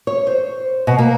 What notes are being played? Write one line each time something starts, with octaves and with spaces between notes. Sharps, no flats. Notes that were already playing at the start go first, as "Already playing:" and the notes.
C#5
C5
B2
A#3